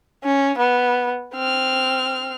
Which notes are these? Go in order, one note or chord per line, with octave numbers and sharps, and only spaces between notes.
C#4
B3
C4 F6